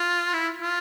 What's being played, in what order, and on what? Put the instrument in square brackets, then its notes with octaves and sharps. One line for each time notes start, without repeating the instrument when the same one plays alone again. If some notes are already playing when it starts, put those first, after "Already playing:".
Already playing: [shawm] F4
E4
F4